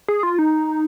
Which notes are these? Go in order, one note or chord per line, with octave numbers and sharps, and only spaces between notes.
G#4
F4
D#4